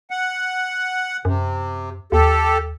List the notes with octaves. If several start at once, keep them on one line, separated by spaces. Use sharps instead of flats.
F#5
F#2 C3
D#2 G4 A4